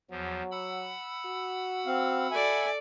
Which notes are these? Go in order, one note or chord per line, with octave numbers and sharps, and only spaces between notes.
E2 F3 F#3
F#5 B5 E6
F#4
C4 F5
A4 D5 E5 G#5